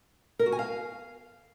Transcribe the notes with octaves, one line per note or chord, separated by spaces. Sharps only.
A#4
F#4
G#5
F5